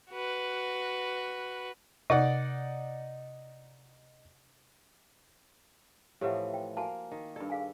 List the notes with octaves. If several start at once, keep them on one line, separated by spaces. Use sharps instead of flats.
F#4 B4
C3 D#4 D5 F#5
A2 E3 F3 G4 B4 F#5
G5
A#3 F#4 G#5 A5
D#3
G2 A4 D5 B5
G#4 F5 G#5